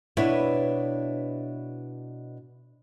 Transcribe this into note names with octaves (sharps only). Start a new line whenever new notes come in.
B2 D4 E4 B4 C#5